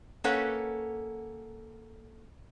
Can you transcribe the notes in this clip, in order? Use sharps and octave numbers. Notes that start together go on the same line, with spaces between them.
A#3 C#4 A4 B4 C#5 F#5